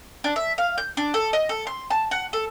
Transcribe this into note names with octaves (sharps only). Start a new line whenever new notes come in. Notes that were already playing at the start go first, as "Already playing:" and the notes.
D4
E5
F5
G6
D4
A4
D#5
A4
C6
A5
F#5
A4